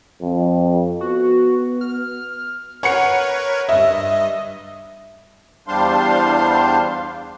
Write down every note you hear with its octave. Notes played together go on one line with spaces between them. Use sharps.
F2
B3 F#4
F6
A#4 B4 C#5 F#5 C#7
G2 D#5 E5
E2 G3 D4 C5 F5 C6